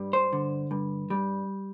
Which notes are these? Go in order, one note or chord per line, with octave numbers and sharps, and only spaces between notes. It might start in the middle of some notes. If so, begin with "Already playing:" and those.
Already playing: G2 G3
C5
D3
G2
G3